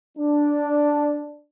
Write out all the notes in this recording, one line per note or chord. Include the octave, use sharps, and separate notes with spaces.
D4